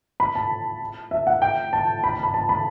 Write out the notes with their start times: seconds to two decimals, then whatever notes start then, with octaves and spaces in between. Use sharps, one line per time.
0.20 B5
0.35 A5
1.11 E5
1.27 F#5
1.42 G5
1.73 A5
2.04 B5
2.13 A5
2.23 B5
2.34 A5
2.49 B5